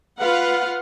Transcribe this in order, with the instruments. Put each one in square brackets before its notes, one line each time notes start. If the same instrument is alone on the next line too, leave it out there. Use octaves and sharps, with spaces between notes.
[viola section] F4 B4 F5 F#5